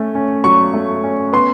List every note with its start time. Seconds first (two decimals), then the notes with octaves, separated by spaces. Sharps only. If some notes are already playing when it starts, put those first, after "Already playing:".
Already playing: A3 C#4
0.15 C#4
0.44 F#3 C#6
0.74 A3
1.04 C#4
1.33 B3 C6